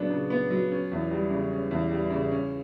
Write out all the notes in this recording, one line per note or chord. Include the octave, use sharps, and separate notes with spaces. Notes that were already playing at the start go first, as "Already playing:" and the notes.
Already playing: C#3 F#3 B3 D4
C#3
B3
F#3
C#4
E2
G3
C#3
C#4
E2
G3
C#3
C#4